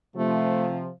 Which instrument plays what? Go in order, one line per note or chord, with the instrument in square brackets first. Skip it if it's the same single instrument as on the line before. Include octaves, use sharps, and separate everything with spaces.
[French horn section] C3 F3 [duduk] A3